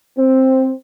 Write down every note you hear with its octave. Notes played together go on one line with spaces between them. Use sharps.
C4